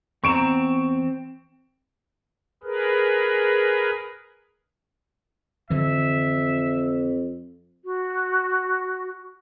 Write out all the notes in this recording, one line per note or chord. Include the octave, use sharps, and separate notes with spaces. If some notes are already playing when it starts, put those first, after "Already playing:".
E2 C4 A#5 C#6 D7 E7
G#4 A#4 B4
F2 D3 E3 E5
F#4